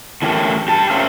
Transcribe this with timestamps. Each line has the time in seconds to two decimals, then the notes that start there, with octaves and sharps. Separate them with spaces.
0.22 A2 E3 C#4 G4 A4 A#4
0.68 G4 A5
0.90 C#4 A#4 C5 E5 F5